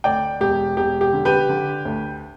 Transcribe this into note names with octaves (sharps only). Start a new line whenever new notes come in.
D2 D5 G5
E1 G4
E1 G4
G4
D3
G4 B4
D3
D2